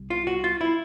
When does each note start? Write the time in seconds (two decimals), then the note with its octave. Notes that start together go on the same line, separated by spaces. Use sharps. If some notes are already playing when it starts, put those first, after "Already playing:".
Already playing: C2
0.10 F4
0.27 F#4
0.44 F4
0.61 E4